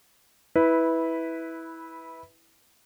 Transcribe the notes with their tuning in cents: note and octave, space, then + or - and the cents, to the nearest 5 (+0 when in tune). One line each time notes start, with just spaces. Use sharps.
E4 -15 B4 +0